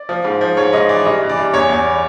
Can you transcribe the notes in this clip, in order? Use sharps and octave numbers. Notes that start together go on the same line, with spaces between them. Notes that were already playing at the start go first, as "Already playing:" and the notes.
Already playing: D5
F3
G#2
F3
G#2 C#5
G#2 D#5
E3 D5
G2 D#5
E3
D5
G2
E2 C#5
E2
D5
E3